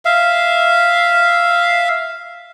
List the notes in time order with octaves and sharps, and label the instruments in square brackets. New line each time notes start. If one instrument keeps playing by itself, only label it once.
[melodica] E5 F5